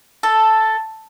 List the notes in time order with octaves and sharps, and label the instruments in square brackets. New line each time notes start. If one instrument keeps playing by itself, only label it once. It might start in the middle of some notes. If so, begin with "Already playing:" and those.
[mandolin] A4